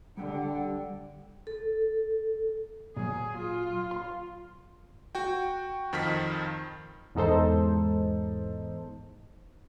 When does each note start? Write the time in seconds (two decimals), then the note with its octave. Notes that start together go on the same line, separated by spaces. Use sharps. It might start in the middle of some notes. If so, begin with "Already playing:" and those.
0.17 D3 G3 D4 F#5 G5
1.47 A4
2.97 A#2 F#3 G#4
3.38 F4
3.91 C6
5.15 F#4 G5
5.93 F2 D#3 F3 F6 B6
7.15 E2 G#2 D#4 A4 C5